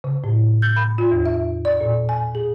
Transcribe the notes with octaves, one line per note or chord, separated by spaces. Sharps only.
C#3
A2
G6
B5
F4
E2
E5
D5
A#2
G#5
G#4